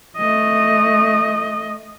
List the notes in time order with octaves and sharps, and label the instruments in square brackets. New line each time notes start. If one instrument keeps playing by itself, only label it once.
[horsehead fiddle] A3 D#5